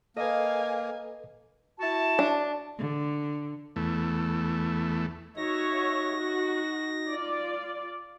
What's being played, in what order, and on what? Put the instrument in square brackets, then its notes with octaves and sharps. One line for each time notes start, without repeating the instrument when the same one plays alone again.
[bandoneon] A#3 [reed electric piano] A4 B4 [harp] D#5 [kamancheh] F5 G#5
[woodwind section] E4 F#4 A5
[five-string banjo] D4
[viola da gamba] D3
[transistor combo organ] E2 A3
[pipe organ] D#4 A#6 [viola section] F#4 C#5 E5
[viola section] F#4
F4 D5